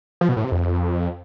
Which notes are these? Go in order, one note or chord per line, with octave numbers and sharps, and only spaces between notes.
F3
B2
A2
C3
F2